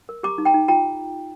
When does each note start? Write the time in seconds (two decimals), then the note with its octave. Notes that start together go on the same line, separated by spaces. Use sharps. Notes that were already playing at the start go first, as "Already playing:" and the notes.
0.09 A#4
0.23 G4 A#5 D6
0.38 D#4
0.45 G5 A#5
0.54 D#4
0.68 F4 G5 A#5